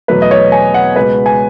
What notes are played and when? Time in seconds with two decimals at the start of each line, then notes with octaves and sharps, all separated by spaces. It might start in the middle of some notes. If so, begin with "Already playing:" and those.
0.08 E2 B2 F#3 A3 B4
0.22 D#5
0.31 C#5
0.52 G#5
0.74 F#5
0.96 C#2 B2 G#3 B4
1.26 G#5